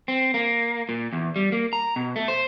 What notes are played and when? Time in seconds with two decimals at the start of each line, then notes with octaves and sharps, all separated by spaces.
0.08 C4
0.34 A#3
0.89 A#2
1.13 E2
1.36 G3
1.52 A#3
1.73 A#5
1.96 B2
2.16 A3
2.28 C5